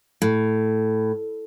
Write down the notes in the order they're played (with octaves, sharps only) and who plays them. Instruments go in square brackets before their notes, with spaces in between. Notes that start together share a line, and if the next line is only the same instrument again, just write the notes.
[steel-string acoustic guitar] A2